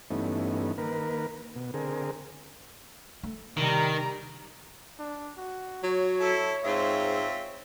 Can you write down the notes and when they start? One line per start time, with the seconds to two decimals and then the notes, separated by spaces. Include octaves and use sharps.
0.10 G2 E3 A3 B3 C#4 D#4
0.78 D#3 A#3 A#4 B4
1.56 B2
1.74 D3 C4 G#4 A#4
3.23 A3
3.57 C3 D#3 G3 A#5
4.99 D4
5.37 F#4
5.84 F#3 C#5
6.21 E4 A4
6.64 G#2 C4 F4 E5